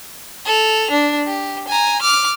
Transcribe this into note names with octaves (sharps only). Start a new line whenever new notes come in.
A4 F7
D4
G4
G#5 A#5
D6 F6